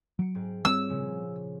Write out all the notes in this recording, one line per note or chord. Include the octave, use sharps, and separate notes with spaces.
F#3 C#7 D7
G#2 C4
G3 C4 F4 C#5 E6
A#2 C#3 F3